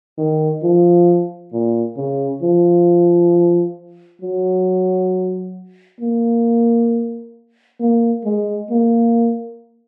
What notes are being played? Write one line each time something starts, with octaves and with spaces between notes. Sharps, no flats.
D#3
F3
A#2
C#3
F3
F#3
A#3
A#3
G#3
A#3